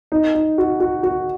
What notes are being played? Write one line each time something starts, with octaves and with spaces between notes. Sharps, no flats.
D#4
D#4
F#4
F#4
F#4